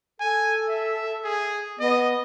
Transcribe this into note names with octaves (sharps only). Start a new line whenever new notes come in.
A4 G#5
E5
G#4
B3 D#5